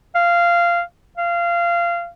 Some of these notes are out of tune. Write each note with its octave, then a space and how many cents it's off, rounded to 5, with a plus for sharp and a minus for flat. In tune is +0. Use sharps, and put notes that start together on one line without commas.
F5 -15
F5 -20